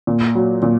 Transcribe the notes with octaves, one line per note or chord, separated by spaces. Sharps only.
A#2
F#3
A#2